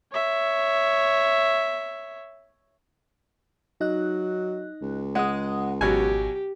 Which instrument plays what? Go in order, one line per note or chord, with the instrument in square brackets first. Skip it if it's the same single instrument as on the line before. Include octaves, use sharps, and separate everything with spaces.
[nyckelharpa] C#5 E5
[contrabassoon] F#3 [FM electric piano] D#4 D#5 F#6
[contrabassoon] C#2
[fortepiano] G#3 [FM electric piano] F#5 D#6
[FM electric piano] G#1 [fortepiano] B2 F#3 G#5 [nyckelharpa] G4